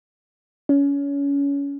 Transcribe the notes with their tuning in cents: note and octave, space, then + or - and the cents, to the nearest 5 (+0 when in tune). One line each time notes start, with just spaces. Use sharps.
C#4 +25